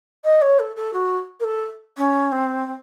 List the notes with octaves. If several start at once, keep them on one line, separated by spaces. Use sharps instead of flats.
D#5
C#5
A4
A4
F#4
A#4
A4
C#4
C4
C4